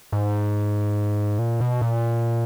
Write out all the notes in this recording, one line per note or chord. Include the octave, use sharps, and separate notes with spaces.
G#2
A#2
B2
A#2